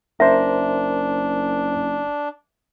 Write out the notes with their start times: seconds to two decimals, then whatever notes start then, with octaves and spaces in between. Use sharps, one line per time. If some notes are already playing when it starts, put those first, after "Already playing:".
0.20 F#1 D4 A#4 C5 E5